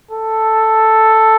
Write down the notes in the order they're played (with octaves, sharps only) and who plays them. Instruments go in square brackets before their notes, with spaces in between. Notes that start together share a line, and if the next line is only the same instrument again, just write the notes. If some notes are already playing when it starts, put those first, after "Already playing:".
[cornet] A4